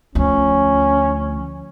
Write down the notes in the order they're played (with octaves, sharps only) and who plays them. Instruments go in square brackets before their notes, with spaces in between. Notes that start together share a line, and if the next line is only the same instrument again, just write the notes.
[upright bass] D2 F3 [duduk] C#4